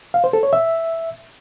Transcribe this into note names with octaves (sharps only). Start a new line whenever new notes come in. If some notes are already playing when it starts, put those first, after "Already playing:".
F5
C5
A4
C#5
E5